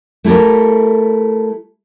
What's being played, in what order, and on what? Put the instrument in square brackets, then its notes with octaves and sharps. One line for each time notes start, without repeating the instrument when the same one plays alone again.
[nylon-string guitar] A3 E4 G4 A4 A#4